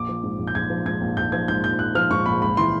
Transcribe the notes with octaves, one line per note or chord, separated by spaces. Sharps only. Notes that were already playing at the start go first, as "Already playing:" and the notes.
Already playing: A#1 D6
F3
G#2
A#1
G6
A#1 G#6
F3
G#2 G#6
A#1
A#1 G6
F3 G#6
G#2 G6
A#1 G6
A#1 F#6
F3 F6
G#2 C#6
A#1 B5
C#2 B5
E3 C6